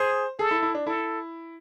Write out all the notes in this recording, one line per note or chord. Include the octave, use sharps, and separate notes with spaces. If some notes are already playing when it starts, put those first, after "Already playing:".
Already playing: G#4 C5
G#4 A4
E4
E4
D4
E4 A4